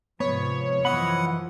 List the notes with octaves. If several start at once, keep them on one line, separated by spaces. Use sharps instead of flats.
G#2 C3 F3 B3 C#5
F#2 E3 F3 D#5 F#5 B5